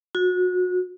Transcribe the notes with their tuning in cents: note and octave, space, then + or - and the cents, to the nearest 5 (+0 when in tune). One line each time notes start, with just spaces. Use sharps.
F#4 -30